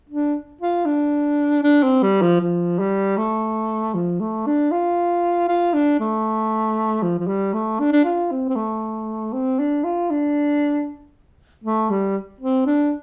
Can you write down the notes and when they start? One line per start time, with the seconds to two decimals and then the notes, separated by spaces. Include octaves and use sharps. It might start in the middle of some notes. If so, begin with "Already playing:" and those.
0.09 D4
0.61 F4
0.86 D4
1.63 D4
1.82 C4
2.02 G3
2.21 F3
2.41 F3
2.79 G3
3.17 A3
3.94 F3
4.20 A3
4.46 D4
4.71 F4
5.48 F4
5.73 D4
6.00 A3
7.02 F3
7.19 F3
7.27 G3
7.53 A3
7.80 D4
7.92 D4
8.04 F4
8.31 C4
8.49 C4
8.55 A3
9.33 C4
9.59 D4
9.84 F4
10.10 D4
11.64 A3
11.90 G3
12.40 C4
12.66 D4